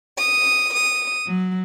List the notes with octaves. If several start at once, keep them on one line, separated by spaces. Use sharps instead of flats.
D#6
D#6
F#3